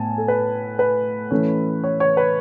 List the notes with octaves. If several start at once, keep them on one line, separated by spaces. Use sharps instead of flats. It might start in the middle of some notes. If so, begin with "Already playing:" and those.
Already playing: A2 B3 G#5 A5
A4
B4
B4
E3 A3 C#4
C#5
C#5
B4